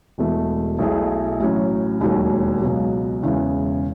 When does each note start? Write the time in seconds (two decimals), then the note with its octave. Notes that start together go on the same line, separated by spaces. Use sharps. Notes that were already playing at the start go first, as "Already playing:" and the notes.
0.18 E1 E2 B2 A3
0.78 B1 B2 A3 E4 G#4
1.40 A1 A2 F#3 C#4
2.00 E1 D#2 D#3 F#3
2.62 C#2 B2 F#3
3.22 E1 E2 C#3 E3